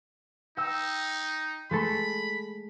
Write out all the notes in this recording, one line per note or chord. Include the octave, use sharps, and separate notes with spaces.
D#4 G5 E6
G#3 A3 A4 B5